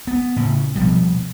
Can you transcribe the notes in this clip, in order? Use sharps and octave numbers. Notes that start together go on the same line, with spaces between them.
B3
A2 C#3
B2 F3 G3